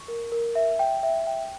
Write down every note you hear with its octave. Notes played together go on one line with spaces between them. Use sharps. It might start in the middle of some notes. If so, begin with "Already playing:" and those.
Already playing: C#6
A#4
A#4
E5
G5
E5
G5